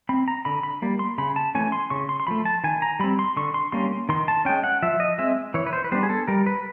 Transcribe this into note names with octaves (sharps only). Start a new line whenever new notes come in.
C4 B5
A#5
D3 B5
B5
G3 A#3
C6
C#3 B5
A5
E3 A3 C#4 G#5
C6
C#3 C#6
C6
C6
F3 A3 B5
A5
D#3 G#5
A#5
G3 C4 B5
C6
D3 C#6
C6
G3 A#3 C#4 C6
D#3 C6
A5
G#3 C#4 G5
F#5
F3 E5
D#5
G#3 C4 E5
E3 C#5
B4
C5
B4
G3 B3 D4 C5
G#4
A4
G3 A#4
B4